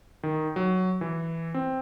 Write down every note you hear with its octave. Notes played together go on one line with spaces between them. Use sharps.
D#3
F#3
E3
C4